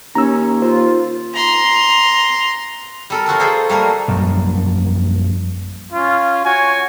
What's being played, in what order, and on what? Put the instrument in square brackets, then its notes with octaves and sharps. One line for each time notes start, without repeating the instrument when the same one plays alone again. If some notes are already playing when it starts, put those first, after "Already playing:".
[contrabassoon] D#2 [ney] C#4 [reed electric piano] A#5 E6
[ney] F4 [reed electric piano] C5
[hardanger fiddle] A#5 C6
[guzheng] G3 A4 A#4
F3 F#4 A4 A#4
G#4 A4 C5 D5 D#5
G3 A3 A#3 A#4
[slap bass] A#1 F#2 F#3 G3
[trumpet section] C#4 F4
F#4 C#5 G#5